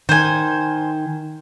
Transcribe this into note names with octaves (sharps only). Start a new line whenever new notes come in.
D#3 C5 G#5